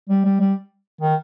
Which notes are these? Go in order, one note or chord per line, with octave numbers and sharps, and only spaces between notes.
G3
G3
G3
D#3